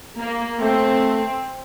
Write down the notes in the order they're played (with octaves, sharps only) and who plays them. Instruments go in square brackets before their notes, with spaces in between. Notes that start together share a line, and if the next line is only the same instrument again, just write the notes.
[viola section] A#3
[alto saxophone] A3 [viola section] C4